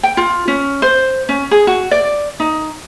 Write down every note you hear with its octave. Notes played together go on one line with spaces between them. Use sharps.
G5
F4
C#4
C5
C#4
G#4
F#4
D5
D#4